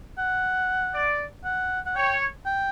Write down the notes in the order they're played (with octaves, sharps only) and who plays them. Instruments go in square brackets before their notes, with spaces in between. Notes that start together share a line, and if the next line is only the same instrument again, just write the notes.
[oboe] F#5
[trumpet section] D5
[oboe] F#5
F#5
[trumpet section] C#5 [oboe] G5
[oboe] G5